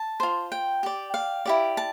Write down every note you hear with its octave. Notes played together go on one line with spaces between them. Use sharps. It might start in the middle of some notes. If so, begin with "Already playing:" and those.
Already playing: A5
F4 C5
G5
G4 D5
F5
E4 G4 D5
A5